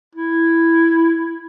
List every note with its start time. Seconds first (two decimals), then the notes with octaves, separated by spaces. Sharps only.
0.15 E4